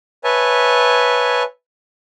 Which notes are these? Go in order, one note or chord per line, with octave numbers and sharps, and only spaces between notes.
B4 C#5 E5 G#5 A5